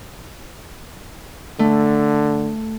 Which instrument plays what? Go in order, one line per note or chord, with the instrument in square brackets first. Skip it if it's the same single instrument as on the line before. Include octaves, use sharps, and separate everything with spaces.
[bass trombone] D3 [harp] A3